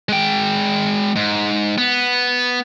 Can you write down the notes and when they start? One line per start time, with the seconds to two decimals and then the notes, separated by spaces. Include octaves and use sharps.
0.09 G#3 G5
1.16 G#2
1.78 B3